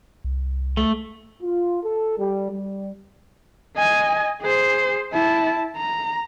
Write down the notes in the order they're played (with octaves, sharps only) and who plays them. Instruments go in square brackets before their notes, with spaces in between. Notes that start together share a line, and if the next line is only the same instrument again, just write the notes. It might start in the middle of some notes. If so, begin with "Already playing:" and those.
[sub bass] C2
[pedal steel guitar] A3
[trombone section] F4
A4
G3
G3
[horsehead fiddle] D#5 G#5
G#4 C5
E4 A5
A#5